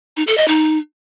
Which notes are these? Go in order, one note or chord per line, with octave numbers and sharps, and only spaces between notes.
D#4
A4
D#5
D#4